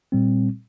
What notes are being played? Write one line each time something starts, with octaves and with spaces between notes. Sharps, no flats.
A#2 G3 C4